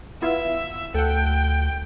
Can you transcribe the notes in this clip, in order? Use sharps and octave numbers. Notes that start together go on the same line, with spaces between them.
B3 E4 F4 E5
D2 A4 F#5 G5